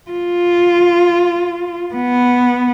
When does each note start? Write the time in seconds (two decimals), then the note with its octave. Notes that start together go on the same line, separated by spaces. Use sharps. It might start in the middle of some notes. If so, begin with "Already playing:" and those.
0.11 F4
1.94 B3